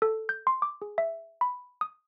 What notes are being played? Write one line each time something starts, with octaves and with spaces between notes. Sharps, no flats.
A4
G6
C6
D6
G#4
E5
B5
D#6